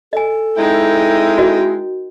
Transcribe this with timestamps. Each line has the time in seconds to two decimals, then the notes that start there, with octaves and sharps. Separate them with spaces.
0.13 A4 D#5 G#5
0.57 G#3 C4 D#4 E4 G5
1.38 F#4 A#4 D#5